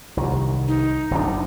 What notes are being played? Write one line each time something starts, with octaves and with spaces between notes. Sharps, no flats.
C2 D#3
D#4
F#1 B2 D4